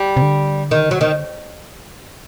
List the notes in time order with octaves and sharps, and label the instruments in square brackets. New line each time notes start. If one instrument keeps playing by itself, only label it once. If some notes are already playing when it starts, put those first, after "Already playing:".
Already playing: [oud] G3
[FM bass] C3
D3
[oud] D#3
F#3
D#3